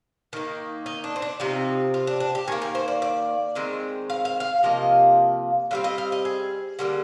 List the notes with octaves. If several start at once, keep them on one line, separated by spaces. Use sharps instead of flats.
D#3 A#3
D#4
D4
C4
D4
C3 F3 C4 D#4
F4
D4
D4
G4
D#3 A#3 G#4
A#4
C5
D5
D5
D#3 G#3 C4
F5
F5
F5
C3 F3 A#3 D#5
D3 G3 C4 F5
D#5
F5
D#5
G#4
D3 G3 A#3